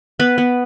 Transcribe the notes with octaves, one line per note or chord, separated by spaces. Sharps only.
B3 B4
B3